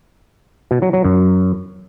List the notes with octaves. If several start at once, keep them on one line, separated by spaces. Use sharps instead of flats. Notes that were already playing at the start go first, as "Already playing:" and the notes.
B2
F#3
F#3
F#2